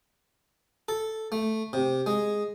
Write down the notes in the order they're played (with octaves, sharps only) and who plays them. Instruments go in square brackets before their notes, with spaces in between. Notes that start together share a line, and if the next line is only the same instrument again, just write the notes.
[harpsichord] A4
A3
C3
G#3